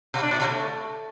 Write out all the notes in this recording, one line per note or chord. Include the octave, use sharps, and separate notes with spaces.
B2
D4
A#2
B2
A3